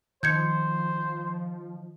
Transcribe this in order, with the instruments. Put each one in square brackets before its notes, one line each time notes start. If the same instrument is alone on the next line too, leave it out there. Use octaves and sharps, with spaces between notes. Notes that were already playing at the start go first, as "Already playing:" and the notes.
[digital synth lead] D#3 [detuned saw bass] F3 [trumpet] C5 [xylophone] G6 G#6 C#7